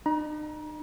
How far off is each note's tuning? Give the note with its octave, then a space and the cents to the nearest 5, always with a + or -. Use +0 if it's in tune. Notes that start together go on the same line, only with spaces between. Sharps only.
D#4 -40 A#5 +35